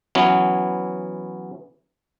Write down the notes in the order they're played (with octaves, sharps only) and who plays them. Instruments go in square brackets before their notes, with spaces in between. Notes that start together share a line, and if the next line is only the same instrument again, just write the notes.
[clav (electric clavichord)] E3 F#3 B3 C#4